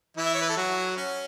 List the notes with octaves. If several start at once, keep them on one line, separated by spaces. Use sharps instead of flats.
E3 E4
E5
C#5
B4
A4
F#3 F#4
C#4